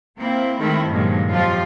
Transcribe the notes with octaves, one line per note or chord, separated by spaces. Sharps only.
A#3 C4 E4
D#3 G#3 A3 C4 E4
G2 A#2 D#3 F3 F#3 G#3
F2 F3 F#3 F4 G4